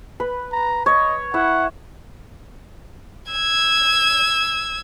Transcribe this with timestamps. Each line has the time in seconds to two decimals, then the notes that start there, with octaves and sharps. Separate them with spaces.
0.20 B4
0.52 A#5
0.86 C#5 D#5
1.34 E4 E5 F#5
3.32 E6 G#6